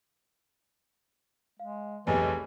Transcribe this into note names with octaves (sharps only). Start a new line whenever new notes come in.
G#3 F5
F1 B1 E3 G4 G#4 G#5